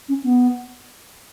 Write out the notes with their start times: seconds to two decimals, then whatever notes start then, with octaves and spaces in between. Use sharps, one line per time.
0.09 C#4
0.24 B3